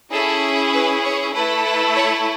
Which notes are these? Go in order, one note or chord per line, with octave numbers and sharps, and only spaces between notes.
C#4 E4 G#4 A4
B4
C#5
A3 E4 A4 B4
B4
C#5